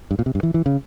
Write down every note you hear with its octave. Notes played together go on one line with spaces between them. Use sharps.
G2
A#2
C3
G2
E3
E3
C#3